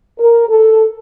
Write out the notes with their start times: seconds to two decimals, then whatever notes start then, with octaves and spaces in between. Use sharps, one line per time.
0.19 A#4
0.49 A4